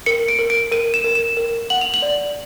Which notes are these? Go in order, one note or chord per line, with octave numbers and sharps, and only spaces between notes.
A#4 C#7
D7
A#4
D7
A#4 D#7
E7
A#4
E7
A#4
F#5 F#7
F7
F#7
D5